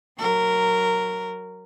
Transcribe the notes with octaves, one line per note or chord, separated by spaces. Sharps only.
F#3 A#4